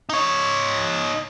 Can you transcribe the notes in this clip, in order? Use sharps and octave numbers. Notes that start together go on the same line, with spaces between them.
D#4 C#5